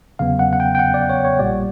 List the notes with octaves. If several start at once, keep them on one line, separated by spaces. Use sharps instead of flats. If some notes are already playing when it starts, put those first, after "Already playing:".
E2 C#3 F#3 B3 F5
F#5
F#5
G5
G5
F#5
D5
C#5
C#5
A#1 A#2 G3 D5